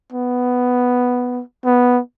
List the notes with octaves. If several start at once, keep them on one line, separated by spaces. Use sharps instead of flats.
B3
B3